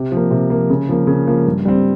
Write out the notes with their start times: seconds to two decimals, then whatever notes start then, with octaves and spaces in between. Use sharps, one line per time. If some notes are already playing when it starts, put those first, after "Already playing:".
Already playing: C3
0.12 F3
0.17 A#3
0.31 C3
0.50 F3 A#3
0.70 C#3
0.89 F3 A#3
1.07 C#3
1.27 F3 A#3
1.46 G2
1.65 G3 C4